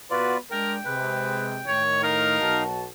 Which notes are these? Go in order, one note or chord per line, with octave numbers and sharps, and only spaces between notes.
B2 F4 F#4 B4 D5
G#3 D4 A#4 G5
C3 G#3 B4
A2 D#3 C#5
D#4 A#4 F5
B1 F#4 A5